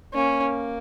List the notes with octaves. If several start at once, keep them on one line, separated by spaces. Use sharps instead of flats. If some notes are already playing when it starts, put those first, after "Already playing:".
A#3 C#4